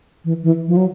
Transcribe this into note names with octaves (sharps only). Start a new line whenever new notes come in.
E3
E3
F3
F#3